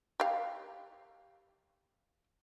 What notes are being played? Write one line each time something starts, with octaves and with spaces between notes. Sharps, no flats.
G4 F5